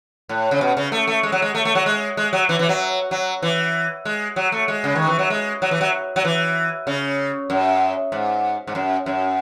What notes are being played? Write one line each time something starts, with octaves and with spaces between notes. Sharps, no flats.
A2
C#3
B2
C#3
A3
A3
G#3
F#3
G#3
A3
A3
F#3
G#3
G#3
F#3
E3
E3
F#3
F#3
E3
G#3
F#3
A3
G#3
C#3
D#3
E3
F#3
G#3
F#3
E3
F#3
F#3
E3
C#3
F#2
G#2
G#2
F#2
F#2